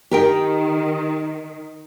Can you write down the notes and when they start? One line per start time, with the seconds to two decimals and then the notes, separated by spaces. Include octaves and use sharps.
0.11 D#3 G4 A#4 G5